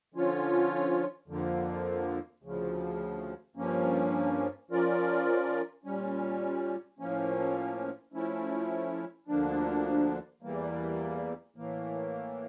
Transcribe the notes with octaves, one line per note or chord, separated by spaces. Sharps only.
D3 F3 C#4 F4 C#5
F2 D3 F3 A#3
D2 C#3 F3
G2 F3 A#3 C#4
F3 C#4 F4 A#4 D5
A#2 G3 C#4
A2 F3 A#3 C#4
F3 A3 C#4 E4
D2 D3 F3 A#3 D4
E2 E3 G3 A#3
A2 E3 A#3